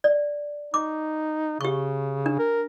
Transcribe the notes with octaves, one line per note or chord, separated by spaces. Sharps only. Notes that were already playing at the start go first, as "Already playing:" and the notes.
D5
D#4 D6
C#3 G4 C#6
D4
A#4